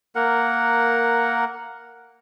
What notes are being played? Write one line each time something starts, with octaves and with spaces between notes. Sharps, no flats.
A#3 A#4 F#5